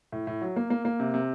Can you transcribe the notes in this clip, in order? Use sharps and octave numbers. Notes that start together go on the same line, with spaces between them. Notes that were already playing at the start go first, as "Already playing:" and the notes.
A2
A2
F#3
A#3
A#3
A#3
C3
C3